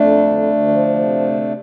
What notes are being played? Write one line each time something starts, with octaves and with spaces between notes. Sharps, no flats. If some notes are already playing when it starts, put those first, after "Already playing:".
Already playing: F2 A3 D4
D2
D2
F3
C3
D2